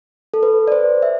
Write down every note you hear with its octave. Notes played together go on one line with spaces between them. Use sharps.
A4
B4
D5
C5
E5